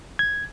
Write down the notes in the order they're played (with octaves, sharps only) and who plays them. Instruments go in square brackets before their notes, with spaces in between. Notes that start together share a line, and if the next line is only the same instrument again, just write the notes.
[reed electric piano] G#6